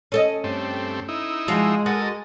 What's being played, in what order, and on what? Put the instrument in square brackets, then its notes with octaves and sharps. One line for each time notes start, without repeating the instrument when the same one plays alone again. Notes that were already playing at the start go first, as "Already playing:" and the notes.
[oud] C#4 A4 D#5
[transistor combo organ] G2 A3 C4
D#4 E4
[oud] F3 F4 F#4 [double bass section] G#3
[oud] F#4 [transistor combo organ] A4 A#4 D#6